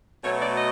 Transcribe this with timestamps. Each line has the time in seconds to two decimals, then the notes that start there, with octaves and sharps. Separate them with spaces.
0.23 B2 F#3 A3 C#5
0.40 D5
0.56 D#5